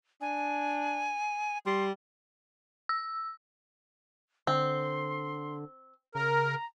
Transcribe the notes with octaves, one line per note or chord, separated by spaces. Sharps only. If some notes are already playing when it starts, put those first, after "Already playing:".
D4 G#5
G3 C6
E6
D3 C4 C6
C#3 A#4 A#5